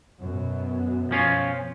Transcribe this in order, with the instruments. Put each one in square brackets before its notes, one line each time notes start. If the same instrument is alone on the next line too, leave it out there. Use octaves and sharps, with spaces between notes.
[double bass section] F#2 B2 B3
[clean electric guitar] F3 C#4 F4